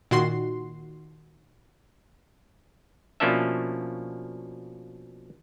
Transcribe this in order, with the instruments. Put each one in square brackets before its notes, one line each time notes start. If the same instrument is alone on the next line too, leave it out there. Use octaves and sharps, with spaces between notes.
[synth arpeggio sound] A#2 D#3 F#4 C6
[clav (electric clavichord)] B2 F3 A#3 C#4 D4 E5